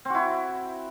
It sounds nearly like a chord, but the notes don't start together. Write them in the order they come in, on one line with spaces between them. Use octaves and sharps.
C4 F#4 E4